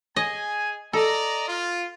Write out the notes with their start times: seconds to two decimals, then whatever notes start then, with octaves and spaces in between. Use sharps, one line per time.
0.16 G#4 D#5 G#5
0.93 A4 D5 D#5 A#5
1.48 F4